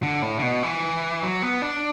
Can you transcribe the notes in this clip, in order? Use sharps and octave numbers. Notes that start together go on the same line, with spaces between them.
D3
A2
D3
B2
E3
F#3
B3
D4